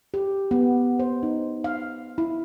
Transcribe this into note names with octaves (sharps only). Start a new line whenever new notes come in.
G4
B3
C5
D#4
F5
E4